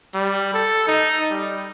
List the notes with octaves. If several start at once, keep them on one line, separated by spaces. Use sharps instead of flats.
G3
A4
D#4
G3